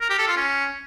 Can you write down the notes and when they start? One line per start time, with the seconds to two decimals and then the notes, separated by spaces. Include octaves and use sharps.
0.01 A#4
0.10 G4
0.19 A4
0.28 F4
0.37 C#4